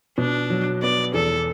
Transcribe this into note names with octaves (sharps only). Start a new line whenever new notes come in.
B2 D4
F#3
B3 D5
E2 A4